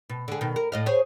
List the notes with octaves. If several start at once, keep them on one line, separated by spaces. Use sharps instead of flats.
B2
D3 G#4
B2 D#3
A#4
A2 D#5 F5
G#4 C5 C#5